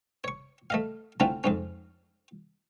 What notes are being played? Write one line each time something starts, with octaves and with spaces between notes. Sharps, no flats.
C#5 C#6
A3 D#5 F5
D3 A3 C4 C#4 E4 F4
F2 G#2 C#4